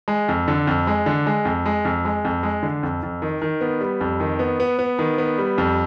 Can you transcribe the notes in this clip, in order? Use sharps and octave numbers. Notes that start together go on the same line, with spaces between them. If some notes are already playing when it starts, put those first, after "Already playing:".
G#3
F2
D3
F2
G#3
D3
G#3
F2
G#3
F2
G#3
F2
G#3
D3
F2
F2
D#3
D#3
B3
G3
F2
D#3
B3
B3
B3
D#3
B3
G3
F2